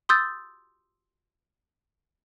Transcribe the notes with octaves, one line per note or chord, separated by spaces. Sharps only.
C6 D#6 E6 G6 A6